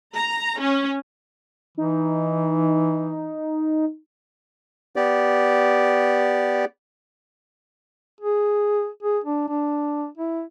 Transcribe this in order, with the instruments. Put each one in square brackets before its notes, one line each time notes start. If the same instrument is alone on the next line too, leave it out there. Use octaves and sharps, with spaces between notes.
[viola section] A#5
C#4
[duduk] E3 [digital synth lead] D#4
[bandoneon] B3 G4 D5
[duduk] G#4
G#4
D4
D4
E4